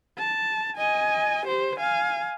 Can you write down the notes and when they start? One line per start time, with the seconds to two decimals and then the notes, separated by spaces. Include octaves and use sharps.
0.19 A5
0.77 D#5 G#5
1.46 G4 C5
1.79 F5 G#5